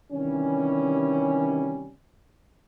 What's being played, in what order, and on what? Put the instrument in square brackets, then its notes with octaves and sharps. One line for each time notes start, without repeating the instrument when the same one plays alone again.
[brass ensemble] C3 D#3 E3 G3 C#4